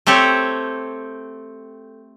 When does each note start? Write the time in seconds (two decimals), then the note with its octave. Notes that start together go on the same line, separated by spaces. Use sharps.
0.07 A3 C4 G4 A4 C#5